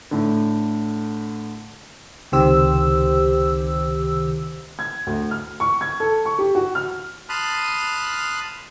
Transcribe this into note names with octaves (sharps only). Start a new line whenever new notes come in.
A2 D3
C#2 C3 D#3 G4 C5 E6
G#6
D2
F6
C#6
G#6
A4
C#6
G4
F#4
F6
A5 B5 C6 D#6 F6 F#6